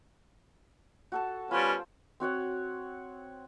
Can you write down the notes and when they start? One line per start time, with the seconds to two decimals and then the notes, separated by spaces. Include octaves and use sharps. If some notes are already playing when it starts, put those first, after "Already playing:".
1.12 F#4 A4 A5
1.51 G3 B3 C#4 F4 C5
2.20 C4 F#4 C#5 F#5